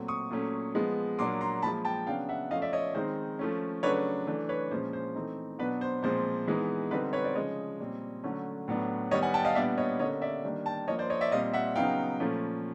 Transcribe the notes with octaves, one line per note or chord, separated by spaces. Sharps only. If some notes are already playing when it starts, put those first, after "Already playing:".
Already playing: A#2 F#3 A3 C4
C#6 D#6
A#2 F#3 A3 C#4
F3 G#3 B3
A#2 F#3 A#3 D4 C6 D6
A#5 C6
A#2 F3 G#3 A5 B5
G5 A5
C#3 F#3 B3 D4 F5 G5
E5 F#5
F3 A3 C#4 D#5 F5
D5 E5
C#5 D#5
D#3 G#3 C4 D#4 C5
F3 A3 C#4
C#3 F#3 A3 D4 B4 C#5
E3 A3 D4
B4 C#5
A#2 F3 G#3 C#4 C5
C5
E3 A3 C4 D#4
B2 F#3 B3 D4 B4
C5
A#2 F3 G#3 C4 C5
E3 G#3 B3 D#4
D3 G3 C4 D#4 B4
B4 C#5
C5 D5
C#3 F3 G#3 C#5 D#5
A#2 G3 C4
D3 F#3 A3 C#4
A2 F#3 B3 D4
D#3 G3 B3 C#5 D#5
F#5 G#5
G5 A5
D#5 F5
A#2 G3 B3 D4 D5 E5
C#5 D#5
D3 G3 A#3 C#4 C#5 D#5
D5 E5
D#3 G3 A#3 D4
G5 A5
F3 A#3 D4 C#5 D#5
C5 D5
C#5 D#5
D5 E5
A#2 G3 C4 D#5 F5
E5 F#5
C#3 F#3 B3 D#4 F5 G5
A#2 F3 A3 C#4